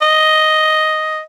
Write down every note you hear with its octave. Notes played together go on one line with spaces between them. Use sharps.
D#5